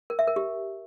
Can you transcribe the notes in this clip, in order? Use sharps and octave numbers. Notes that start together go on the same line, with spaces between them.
A#4
E5
A#4
G4